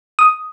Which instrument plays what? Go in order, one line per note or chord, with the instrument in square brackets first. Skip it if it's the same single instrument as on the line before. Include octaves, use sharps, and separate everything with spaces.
[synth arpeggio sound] D#6